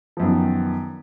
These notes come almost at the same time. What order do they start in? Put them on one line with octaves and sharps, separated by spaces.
F3 F#2 B3 D#3